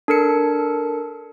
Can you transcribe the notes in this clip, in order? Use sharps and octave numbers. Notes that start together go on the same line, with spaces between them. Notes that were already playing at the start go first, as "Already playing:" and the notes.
D4 A4 A#4 C#7